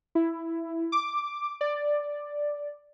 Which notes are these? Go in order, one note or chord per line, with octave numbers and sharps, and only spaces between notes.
E4
D6
D5